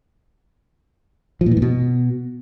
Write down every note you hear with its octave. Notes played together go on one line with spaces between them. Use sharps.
F3
A#2
E3
A2
B2